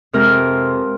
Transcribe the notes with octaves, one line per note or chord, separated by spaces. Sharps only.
F2 C3 F3 G#3 A#4